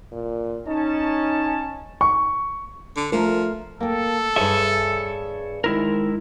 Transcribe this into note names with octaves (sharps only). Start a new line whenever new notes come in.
A#2
C#4 D#4 A5
C#6
D3
F3 A3 A#4
A#3 A4 G5
G2 G#4 C5 C#5 E5
D#3 G#3 E4 A#4 C5